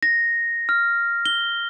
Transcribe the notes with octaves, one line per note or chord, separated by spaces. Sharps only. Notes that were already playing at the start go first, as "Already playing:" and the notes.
A#6
F6
G7